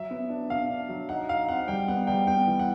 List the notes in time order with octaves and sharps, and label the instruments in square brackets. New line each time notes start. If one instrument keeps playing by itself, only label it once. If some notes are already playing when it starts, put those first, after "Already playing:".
Already playing: [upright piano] F#3 [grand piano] E5
[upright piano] B3
D4
[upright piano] B2 [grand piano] F5
[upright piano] D4
F#3
[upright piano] D#4 [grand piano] F#5
[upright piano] D#4 [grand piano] F5
[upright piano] C4 [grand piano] F#5
[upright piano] G3 [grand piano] G5
[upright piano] B3 [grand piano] F#5
[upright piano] G3 [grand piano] G5
[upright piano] B3 [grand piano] G5
[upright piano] E3
[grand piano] F#5